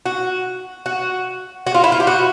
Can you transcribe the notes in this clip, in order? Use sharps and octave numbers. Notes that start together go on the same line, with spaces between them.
F#4
F#4
F#4
F4
E4
F4
G4
F#4